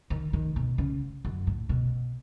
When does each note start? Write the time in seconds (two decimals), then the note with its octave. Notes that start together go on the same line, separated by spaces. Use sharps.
0.10 D#3
0.33 D#3
0.56 B2
0.78 C#3
1.25 F#2
1.47 A2
1.69 B2